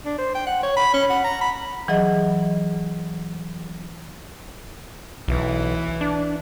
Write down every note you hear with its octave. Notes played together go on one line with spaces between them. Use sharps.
D4
C5
G5
F#5
C#5
B5
C#4
F#5
A#5
B5
E3 F#3 G#4 D#5
B1 E3
D4